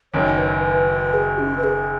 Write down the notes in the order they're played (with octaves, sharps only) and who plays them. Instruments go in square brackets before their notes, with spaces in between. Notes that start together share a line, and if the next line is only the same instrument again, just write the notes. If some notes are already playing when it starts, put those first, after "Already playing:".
[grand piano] F#1 F#2 D#3 [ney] C#5
[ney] B4
B4
B4
G#4
C#4
B4
G#4